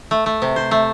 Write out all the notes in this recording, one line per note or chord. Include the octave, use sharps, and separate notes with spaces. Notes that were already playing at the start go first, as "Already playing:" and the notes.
A3
A3
C3
C5
A3